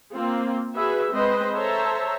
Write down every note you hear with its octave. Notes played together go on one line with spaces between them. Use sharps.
A#3 C4 F4
F#4 G#4 B4 E5
G#3 C4 B4 C5 D#5
A4 C5 C#5 E5 A5 A#5